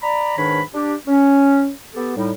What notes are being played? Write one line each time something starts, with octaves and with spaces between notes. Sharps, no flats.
D5 A#5 B5
G#2 D#3 D4 B4 C#5 B5
D4 G4
C#4
B3 G4 A4
A2 G3 D#4